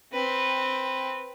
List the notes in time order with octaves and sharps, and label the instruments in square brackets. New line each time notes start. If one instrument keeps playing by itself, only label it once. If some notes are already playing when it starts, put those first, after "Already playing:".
[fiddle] C4 B4